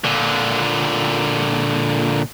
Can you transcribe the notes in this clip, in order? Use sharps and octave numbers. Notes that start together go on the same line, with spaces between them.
A#2 D3